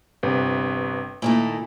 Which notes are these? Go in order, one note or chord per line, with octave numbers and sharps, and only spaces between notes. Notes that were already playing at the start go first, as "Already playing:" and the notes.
G1 C3 B4
A#2 D#3 A3 E4